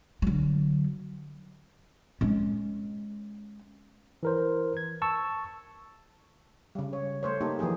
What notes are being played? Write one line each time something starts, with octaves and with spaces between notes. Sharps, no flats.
D3 F#3
G#3 C#4
E3 A#4 C5
G#6
A5 C#6 E6
C#3 G3
C#5
A3 C5 C#5
A#3 D#4 G4 A4
E3 F3 A#3 G4 G#4